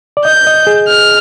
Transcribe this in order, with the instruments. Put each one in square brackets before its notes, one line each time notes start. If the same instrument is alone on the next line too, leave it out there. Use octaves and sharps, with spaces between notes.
[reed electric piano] D5
[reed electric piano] D#5 [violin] G6
[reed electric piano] D#5
G#4
[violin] F6